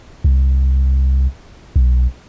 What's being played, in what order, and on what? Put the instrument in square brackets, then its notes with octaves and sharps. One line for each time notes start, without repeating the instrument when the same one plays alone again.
[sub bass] C2
B1